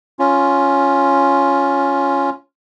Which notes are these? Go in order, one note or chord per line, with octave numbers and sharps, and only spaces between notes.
C#4 F4